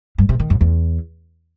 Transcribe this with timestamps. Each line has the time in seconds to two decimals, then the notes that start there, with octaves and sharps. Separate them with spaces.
0.18 G2
0.29 C3
0.39 D#3
0.50 F#2
0.61 E2